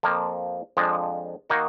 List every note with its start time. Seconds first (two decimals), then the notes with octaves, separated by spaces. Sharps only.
0.03 F2 F3 A#3
0.77 F2 F3 G#3 D4
1.50 D#3 A#3 D#4 F#4